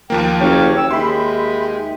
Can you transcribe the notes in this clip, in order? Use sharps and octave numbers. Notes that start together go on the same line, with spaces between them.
D#2 F3 A#3 G5
F#1 G4 C#5 F5 G5
G5 E6
D#2 G#3 E5 G5 B5 C6